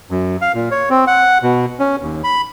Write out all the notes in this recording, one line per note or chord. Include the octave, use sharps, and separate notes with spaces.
F#2
F5
A#2
C#5
C4
F#5
B2
C#4
D#2
B5